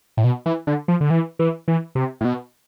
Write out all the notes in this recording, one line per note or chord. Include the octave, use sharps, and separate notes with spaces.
A2
B2
E3
D3
F3
D3
E3
E3
E3
C3
A2
B2